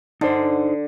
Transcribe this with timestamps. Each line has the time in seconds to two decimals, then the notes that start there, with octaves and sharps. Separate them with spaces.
0.21 D3 D#4 C5